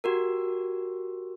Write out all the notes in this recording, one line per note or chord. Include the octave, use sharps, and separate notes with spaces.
F#4 G4 A#4